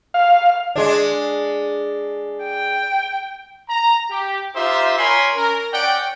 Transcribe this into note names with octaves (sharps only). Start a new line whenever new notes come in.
F5
G#3 D4
G5
A#5
G4
D#4 F4 G4 C5 E5
A#4 C#5 G#5 B5 C6
C#4 A#4
C#4 D5 F#5 G5